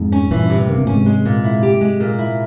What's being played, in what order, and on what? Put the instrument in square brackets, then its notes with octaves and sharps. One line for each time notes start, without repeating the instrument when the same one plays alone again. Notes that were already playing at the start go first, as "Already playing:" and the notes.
Already playing: [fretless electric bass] F2 G#2
[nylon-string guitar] C#4
[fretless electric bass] G2 A#2 [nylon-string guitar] E3
[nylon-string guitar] C3
[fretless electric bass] C#3 [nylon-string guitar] A#3
[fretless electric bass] C3
[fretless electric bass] A#2 [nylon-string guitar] C#4
[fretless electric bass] G#2 C3
[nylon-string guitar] G#3
A#2
E4
G4
G#3
A#2
E4